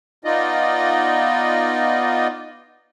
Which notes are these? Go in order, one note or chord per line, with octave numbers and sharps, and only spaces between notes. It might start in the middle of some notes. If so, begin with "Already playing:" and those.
B3 D#4 F4 D5 D#5